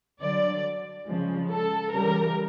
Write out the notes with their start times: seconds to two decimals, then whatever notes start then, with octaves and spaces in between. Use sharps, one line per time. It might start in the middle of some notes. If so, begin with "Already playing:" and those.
0.21 D3 F#3 D5
1.07 C#3 F3 G#3
1.50 A4
1.94 C#3 E3 G3 A#4